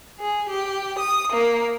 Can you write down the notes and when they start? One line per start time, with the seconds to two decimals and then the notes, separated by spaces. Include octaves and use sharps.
0.19 G#4
0.50 G4
0.99 D#6
1.32 A#3